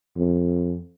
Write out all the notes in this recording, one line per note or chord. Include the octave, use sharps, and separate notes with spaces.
F2